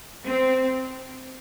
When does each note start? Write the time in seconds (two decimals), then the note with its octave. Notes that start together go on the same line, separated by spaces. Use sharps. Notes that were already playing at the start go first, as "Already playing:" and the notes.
0.26 C4